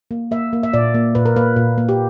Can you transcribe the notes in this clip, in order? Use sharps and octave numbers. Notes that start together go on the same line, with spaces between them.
A#3
A#3 E5
A#3
E5
A#2 D5
A#3
A#2 B4
A#4
A#3 B4
A#2
A#3
G4